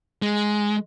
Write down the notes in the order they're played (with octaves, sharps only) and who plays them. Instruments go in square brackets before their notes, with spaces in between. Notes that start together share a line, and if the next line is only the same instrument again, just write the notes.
[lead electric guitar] G#3